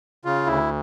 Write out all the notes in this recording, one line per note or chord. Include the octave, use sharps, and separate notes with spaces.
C#3 F4
D2 E4